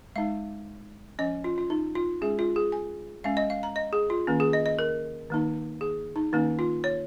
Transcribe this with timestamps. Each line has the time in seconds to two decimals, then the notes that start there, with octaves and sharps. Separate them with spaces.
0.16 G#3 D#4 F5
1.19 F3 C#4 D#5
1.44 F4
1.58 F4
1.70 D#4
1.95 F4
2.21 G#3 C#4 G#4
2.39 F4
2.56 G#4
2.72 G#5
3.24 G#3 C#4 F5
3.37 D#5
3.50 F5
3.63 A#5
3.76 D#5
3.93 G#4
4.10 F4
4.27 D#3 A#3 C#4
4.40 G#4
4.53 D#5
4.66 D#5
4.79 A#4
5.30 D#3 A#3 D#4
5.81 G#4
6.16 D#4
6.33 D#3 A#3 C#4 D#4
6.59 F4
6.84 C#5